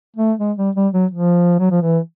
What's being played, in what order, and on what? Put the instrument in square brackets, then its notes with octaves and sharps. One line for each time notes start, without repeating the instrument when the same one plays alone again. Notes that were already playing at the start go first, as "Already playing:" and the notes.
[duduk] A3
G#3
G3
G3
F#3
F3
F#3
F3
E3